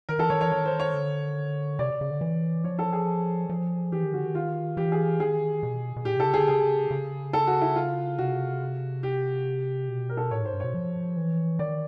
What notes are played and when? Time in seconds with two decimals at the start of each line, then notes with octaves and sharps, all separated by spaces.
0.09 D#3 A#4
0.19 E3 A4
0.30 D#3 C#5
0.40 E3 C#5
0.51 D#3 C#5
0.65 C5
0.80 C#5
0.94 D3
1.79 C3 D5
2.01 C#3
2.11 D3
2.21 E3
2.64 F3 C#5
2.79 A4
2.93 G#4
3.49 F3
3.92 E3 G4
4.03 D#3
4.13 D3 F#4
4.24 D#3
4.35 F4
4.77 E3 G4
4.92 G#4
5.20 D#3 G#4
5.63 B2
5.96 B2
6.05 A#2 G4
6.16 C3 A4
6.27 C#3
6.34 D3 G#4
6.48 C#3 G#4
6.91 C#3
7.33 A4
7.47 F#4
7.61 E4
7.76 F4
8.18 C3 F#4
9.03 G4
9.89 B2
10.09 A#4
10.17 A4
10.31 A2 C#5
10.42 G#2 C5
10.53 G2
10.60 B2 C#5
10.74 F3
11.17 E3
11.59 D#3 D5